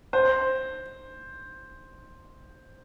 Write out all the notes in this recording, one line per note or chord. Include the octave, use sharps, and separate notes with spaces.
C5